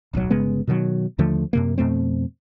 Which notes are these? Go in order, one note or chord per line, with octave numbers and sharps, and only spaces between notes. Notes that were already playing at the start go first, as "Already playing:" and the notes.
D1 B1 A#2 F#3
G1 C#3 G#3 B3
B2 D#3 F3 F#3
D#2 D3 F3 A3
F#2 C3 A#3
F2 B2 A3 C4